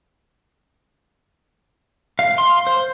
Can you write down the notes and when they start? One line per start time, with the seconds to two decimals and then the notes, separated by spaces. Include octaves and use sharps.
2.19 F5
2.38 C6
2.67 C5